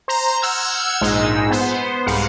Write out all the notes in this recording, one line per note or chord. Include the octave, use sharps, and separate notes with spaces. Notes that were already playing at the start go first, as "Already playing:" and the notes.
C5 A#5
F#5 E6 F6 G6 G#6
A#1 G#2 G#3 D#4 E6
B3 C5
C2 G#2 F5 F#5